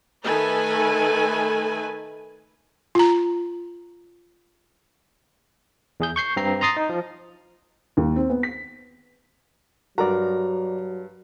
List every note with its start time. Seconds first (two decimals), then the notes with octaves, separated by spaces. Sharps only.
0.25 D#3 A3 A4 B4 G#5
2.95 F4 A#5
6.00 E2 G#4 G6
6.16 C#6 G6 C7
6.37 G2 C4 A#5 C7
6.61 A#5 C6 D#6 A6 C7
6.77 D#4
6.89 F3
7.97 D#2
8.16 C4
8.30 B3
8.43 B6
9.98 G2 F#3 F#4 A#4 D5 A#5